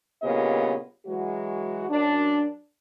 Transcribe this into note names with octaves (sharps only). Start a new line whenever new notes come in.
G2 A#2 C#3 B3 G4 D#5
E3 F#3 G#3 F#4
F#2 D4